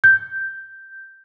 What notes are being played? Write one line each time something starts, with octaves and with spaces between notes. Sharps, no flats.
G6